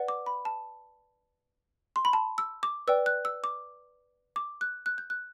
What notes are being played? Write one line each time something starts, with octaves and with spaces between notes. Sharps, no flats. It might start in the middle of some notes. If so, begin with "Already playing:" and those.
Already playing: B4 D5 F#5
D6
B5
A5
C6
B5
A5
E6
D6
B4 D5 G5 E6
F#6
E6
D6
D6
F#6
F#6
G6
F#6